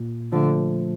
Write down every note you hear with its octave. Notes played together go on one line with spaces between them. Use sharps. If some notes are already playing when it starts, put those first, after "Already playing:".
Already playing: A#2
D3 F3 A3